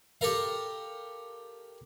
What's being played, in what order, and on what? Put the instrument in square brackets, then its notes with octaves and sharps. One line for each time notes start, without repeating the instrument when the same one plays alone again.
[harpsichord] G4 A4 A#4 F5